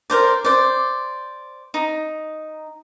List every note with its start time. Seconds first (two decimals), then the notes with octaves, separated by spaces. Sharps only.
0.10 A#4 C5 D5
0.44 C5 D5
1.74 D#4